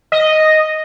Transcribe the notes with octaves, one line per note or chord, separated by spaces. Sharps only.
D#5